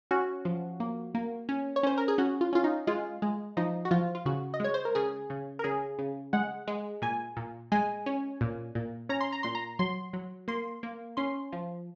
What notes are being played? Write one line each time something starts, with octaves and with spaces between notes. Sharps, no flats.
C#4 F#4
F3
A#3
A#3
C#4
C#5
C#4 C5
A#4
G#4
C#4 F#4
F4
C#4 F4
D#4
G#3 F4
G#3
F3 D#4
F#4
F3 F4
F4
C#3 F#4
D#5
G#3 C#5
C5
A#4
C#3 G#4
C#3
A#4
C#3 G#4
C#3
G#3 F#5
G#3
A#2 G#5
A#2
G#3 G#5
C#4
A#2
A#2
C#4 A#5
C6
A#5
A#2 C6
A#5
F#3 C6
F#3
A#3 C6
A#3
C#4 C6
F3